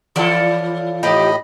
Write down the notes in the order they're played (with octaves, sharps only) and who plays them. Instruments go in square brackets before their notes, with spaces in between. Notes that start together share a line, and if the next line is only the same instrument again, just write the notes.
[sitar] E3 F4 A4 [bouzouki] E4 C#5 D5
[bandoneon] A2 D#5 B5 [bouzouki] F3 D#4 G4